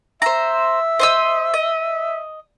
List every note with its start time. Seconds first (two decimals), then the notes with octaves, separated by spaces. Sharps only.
0.22 C5 E5 A#5
0.99 C5 D#5 E6
1.54 D#5